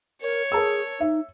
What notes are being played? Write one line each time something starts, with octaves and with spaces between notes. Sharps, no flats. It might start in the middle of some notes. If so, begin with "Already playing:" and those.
A#4 C#5
G#4 A#4 A5 E6
D#4 E5